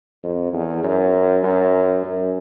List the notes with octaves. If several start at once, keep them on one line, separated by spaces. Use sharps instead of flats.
F2
E2
F#2
F#2
F#2